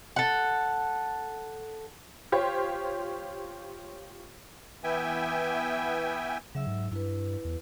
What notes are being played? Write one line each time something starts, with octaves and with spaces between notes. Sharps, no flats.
A4 F#5
F4 G4 C5 C#5
E3 B3 E5 G5 G#5
C#3 F#3 E5 E6
G#2
G2 E4 B4
E2